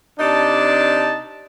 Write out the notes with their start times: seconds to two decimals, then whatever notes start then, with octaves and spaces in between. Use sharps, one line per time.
0.19 C3 D4 D#4 D5 A5